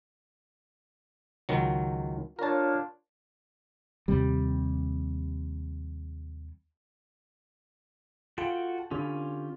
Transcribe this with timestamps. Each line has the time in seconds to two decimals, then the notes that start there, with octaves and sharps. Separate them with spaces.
1.49 C#2 D#3 F#3
2.39 D4 F4 A#4 C#5 A5
4.08 D#2 C3 G3
8.38 F4 F#4 A4 G5
8.91 D3 C#4 F4 G4